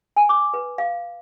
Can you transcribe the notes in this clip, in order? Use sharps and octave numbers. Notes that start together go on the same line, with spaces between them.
G#5
D6
B4
F5